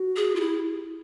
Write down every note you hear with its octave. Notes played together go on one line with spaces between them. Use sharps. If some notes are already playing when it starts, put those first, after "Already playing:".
Already playing: F#4
G#4
F4
E4 G4